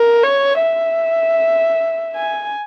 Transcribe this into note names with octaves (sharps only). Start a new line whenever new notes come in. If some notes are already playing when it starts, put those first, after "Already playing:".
Already playing: A#4
C#5
E5
G#5